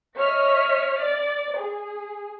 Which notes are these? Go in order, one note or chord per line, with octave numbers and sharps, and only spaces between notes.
C#5 D#5 E5 F6 B6
D5
G#4